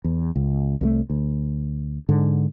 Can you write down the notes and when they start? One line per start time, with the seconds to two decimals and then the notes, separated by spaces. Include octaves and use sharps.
0.04 E2
0.36 C#2
0.81 C2 F3 A3
1.10 D2
2.09 G#2 D3